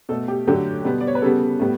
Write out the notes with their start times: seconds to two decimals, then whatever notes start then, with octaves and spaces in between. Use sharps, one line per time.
0.09 B2 A4
0.12 A3
0.28 G4
0.47 D3 F#3 A3 G4
0.84 B2 G3 B3
1.00 D5
1.07 C#5
1.15 B4
1.22 C#3 G3 B3 A4
1.60 A2 G3 B3